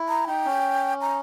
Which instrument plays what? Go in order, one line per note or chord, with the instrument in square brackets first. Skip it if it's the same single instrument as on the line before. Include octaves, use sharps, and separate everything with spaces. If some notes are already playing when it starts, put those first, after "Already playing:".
Already playing: [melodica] E4
[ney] A#5
[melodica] D#4 [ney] G5
[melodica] C#4
[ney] A#5